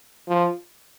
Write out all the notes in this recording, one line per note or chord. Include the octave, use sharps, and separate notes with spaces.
F3